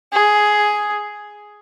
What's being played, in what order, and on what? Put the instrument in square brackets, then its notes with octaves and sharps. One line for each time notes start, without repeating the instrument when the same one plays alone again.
[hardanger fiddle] G#4